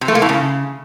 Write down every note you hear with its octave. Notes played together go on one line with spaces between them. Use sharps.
C3
A3
A#3
A2
C#3